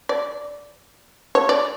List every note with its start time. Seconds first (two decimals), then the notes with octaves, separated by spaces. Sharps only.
0.09 D5
1.35 C#5
1.49 D5